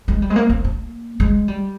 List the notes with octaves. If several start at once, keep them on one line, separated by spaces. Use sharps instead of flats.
G#3
G3
G#3
A#3
C4
A#3
G#3
G3